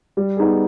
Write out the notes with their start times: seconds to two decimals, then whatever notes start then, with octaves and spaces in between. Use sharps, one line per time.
0.17 G3
0.37 B3 D#4 G#4